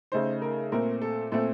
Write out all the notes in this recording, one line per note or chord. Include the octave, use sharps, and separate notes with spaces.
C#3 A3 D#4 C5
A#4
A#2 A3 C4 A#4
A4
A#2 A3 C4 A4